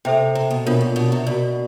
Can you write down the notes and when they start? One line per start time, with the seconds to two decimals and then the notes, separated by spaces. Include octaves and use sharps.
0.05 C3 A4 C5 E5 G5
0.35 C3
0.51 B2
0.66 B2 D4 F4 A#4 C#5
0.81 A#2
0.96 B2
1.12 C3
1.26 B2 F#4 A#4 D5